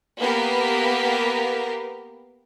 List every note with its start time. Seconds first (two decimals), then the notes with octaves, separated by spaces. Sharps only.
0.18 A#3 B3 G4 A#4 B4